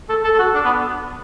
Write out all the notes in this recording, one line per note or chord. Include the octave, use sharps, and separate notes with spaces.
A4
A4
A4
F#4
D4
B3